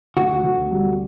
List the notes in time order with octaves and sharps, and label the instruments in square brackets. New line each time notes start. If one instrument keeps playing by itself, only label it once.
[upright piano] D2 [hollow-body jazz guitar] F#4
[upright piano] D2
G3